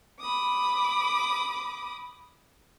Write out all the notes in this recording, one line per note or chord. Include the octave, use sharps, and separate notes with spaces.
B5 D6 D#6